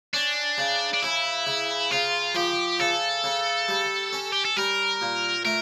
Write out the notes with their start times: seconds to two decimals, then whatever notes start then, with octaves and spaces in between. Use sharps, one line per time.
0.14 C#4 D4
0.58 C#3
0.94 D4
1.03 C#3 E4
1.47 C#3
1.91 C#3 F4
2.35 F3 G4
2.79 C#3 A4
3.24 C#3
3.69 G3
4.13 C#4
4.32 G4
4.45 A4
4.57 G3 A#4
5.01 A#2
5.45 A3 A#4